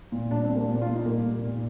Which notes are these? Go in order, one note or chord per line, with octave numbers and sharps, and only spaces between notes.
A#2
G3 D4
C4
A#2
A#3
A#2 D4
F4
A#2
D#4
G3 A#3
A#2
A#2